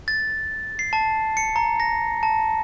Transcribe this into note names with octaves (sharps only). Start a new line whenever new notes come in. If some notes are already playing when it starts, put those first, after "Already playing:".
A6
C7
A5
C#7
A#5
A#6
A5